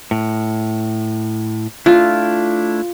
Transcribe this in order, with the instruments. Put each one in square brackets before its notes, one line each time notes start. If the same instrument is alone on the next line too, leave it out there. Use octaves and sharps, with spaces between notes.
[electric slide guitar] A2
[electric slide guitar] A3 D4 E4 [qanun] F4